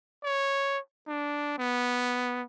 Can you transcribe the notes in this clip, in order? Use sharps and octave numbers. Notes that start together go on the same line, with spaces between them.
C#5
D4
B3